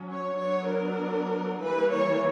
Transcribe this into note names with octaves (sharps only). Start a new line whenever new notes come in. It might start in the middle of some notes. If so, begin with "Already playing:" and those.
Already playing: F#3 C#4
C#5
F#3 B3 D4 C#5
A#4
E3 G3 A#3 B4
C#5